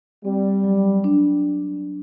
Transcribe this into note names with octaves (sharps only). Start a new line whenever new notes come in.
G3 C4
F#3
D4